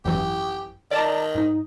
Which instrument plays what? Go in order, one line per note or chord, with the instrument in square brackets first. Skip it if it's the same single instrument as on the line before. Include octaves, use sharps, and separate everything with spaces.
[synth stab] G#1 F#2 E3 [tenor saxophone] G4
[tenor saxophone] D#3 [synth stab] D5 A5 A#5
[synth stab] G#2 D#4